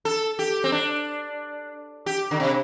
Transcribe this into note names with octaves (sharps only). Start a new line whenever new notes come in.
A4
G4
C4
D4
G4
D3
C3